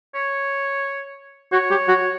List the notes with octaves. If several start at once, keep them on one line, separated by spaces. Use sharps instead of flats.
C#5
F#4 C#5
G4
F#4